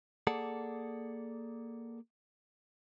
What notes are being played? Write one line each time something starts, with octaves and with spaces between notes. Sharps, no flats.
A#3 G#4 A4 D5 F#5 A5